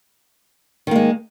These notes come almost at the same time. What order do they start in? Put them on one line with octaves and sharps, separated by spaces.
D#3 A#3 G#3